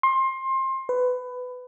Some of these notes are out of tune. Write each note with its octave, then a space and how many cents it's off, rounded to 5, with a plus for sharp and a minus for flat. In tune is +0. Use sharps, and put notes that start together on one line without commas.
C6 +25
B4 +20